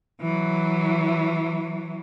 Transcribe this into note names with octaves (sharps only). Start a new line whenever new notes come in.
E3 F#3